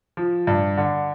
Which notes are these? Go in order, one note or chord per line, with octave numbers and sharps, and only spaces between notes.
F3
G2
D3